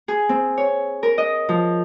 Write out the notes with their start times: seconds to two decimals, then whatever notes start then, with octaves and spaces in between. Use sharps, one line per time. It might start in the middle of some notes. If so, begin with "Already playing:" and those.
0.08 G#4
0.29 C4
0.57 C#5
1.03 A#4
1.18 D#5
1.49 F3